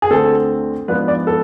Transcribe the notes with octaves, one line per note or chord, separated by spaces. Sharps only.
G#4
D2 D3 A3 C4 A4
G#2 F3 B3 D4 B4
D5
A4